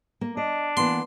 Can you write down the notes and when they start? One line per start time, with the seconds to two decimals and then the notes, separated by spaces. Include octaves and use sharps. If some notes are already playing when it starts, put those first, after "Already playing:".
0.21 A#3
0.37 D4 D#5
0.77 E3 A#3 B3 C6